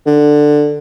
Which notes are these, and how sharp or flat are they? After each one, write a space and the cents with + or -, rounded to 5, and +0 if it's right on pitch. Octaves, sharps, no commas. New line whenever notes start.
D3 +10